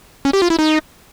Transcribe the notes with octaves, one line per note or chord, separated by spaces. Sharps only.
C#4
G4
F4
E4
D#4